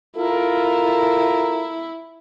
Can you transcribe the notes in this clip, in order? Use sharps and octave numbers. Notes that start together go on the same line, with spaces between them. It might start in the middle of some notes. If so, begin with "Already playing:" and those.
E4 F4 A4 A#4